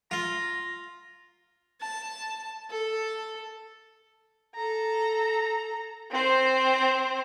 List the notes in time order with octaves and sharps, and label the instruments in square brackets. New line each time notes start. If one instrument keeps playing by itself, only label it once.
[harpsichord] F4 [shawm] A#5
[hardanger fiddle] A5
A4
[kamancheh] A4 A#5
C4 C5